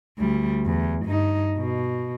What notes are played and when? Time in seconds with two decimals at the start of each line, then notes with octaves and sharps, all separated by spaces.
0.18 D2 G3
0.66 E2
1.05 G2 D#4
1.57 B2